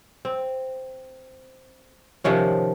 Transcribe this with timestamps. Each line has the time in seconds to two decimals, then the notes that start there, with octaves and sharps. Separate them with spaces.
0.25 C4
2.24 C3 D#3 F3 C#4